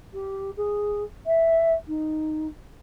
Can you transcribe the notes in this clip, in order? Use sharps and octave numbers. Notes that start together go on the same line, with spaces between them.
G4
G#4
E5
D#4